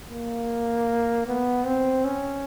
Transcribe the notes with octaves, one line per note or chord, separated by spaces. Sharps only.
A#3
B3
C4
C#4